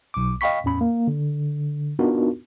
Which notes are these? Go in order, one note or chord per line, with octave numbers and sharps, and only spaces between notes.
B1 D6
D#5 F5 G5 B5 C#6 B6
E2 A2 C#4 B5
A#3
D3
B3 D4 D#4 F4 F#4 A#4